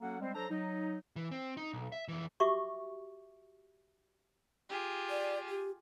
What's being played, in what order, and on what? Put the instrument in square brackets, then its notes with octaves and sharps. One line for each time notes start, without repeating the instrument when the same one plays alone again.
[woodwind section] F#3 A#3 C#4 F#4 A4 F#5
G3 G#3 C4
F#3 D4 A4 C5 A#5
F#3 D#4
[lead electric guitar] E3
C4
D#4
B1
E5
F2 E3
[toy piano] F#4 G4 E5 C#6 D6
[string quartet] F4 G4 G#4
[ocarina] D5
G4